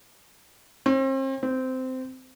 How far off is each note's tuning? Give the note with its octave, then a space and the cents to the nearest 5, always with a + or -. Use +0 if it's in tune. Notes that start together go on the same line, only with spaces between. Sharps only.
C4 +40
C4 -15